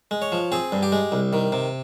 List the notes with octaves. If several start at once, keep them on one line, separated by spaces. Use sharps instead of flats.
G#3
C#5
F3
C4 G#4
G2
G4
G#3
C2
D#3
C3